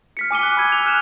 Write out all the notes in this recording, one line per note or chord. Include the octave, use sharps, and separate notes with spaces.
F6 B6 C#7
G#5 D6 D#7 G7
F#6
B5 E6 G#6 D#7
F7
F6 F#6 E7